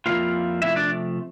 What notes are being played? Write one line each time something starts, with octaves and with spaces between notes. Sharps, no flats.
F2 E3 G3 A#3 E4 F4 F5
C3 F3 A3 E4 E5
D4 D5